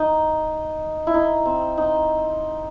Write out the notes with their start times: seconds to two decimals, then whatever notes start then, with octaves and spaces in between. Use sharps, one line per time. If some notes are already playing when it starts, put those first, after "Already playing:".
Already playing: D#4
1.07 E4
1.14 D#4
1.45 C4
1.78 D#4